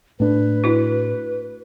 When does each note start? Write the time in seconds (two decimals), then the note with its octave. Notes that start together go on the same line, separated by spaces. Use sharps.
0.20 A2 D4 B4
0.64 E4 F#4